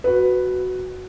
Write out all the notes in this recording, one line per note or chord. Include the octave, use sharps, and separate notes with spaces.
F#4 B4